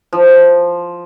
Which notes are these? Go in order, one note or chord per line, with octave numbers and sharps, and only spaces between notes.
F3